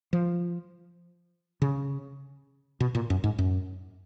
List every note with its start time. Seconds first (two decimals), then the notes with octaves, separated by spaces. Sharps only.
0.13 F3
1.62 C#3
2.80 B2
2.95 A#2
3.10 F#2
3.24 G#2
3.38 F#2